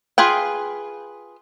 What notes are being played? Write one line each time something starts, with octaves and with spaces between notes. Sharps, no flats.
F4 G#4 B4 G5